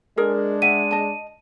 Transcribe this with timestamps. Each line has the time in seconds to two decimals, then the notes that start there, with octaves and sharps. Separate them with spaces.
0.17 G#3 D4 G#4 A#4
0.62 E5 F#5 D#7
0.91 D#5 A5